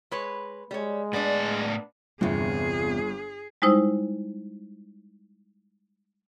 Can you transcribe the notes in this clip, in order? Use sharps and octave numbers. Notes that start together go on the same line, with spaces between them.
G#3 B4 C#5
G3 G#3 C#5
A2 B3 D4 D5
G1 E2 C3 G#4
G3 G#3 D#4 E4 C5 D#6